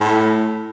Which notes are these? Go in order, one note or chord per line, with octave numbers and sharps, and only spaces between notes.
A2